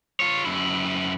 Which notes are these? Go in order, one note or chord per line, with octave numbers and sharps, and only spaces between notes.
F4 C#5
F#2 E4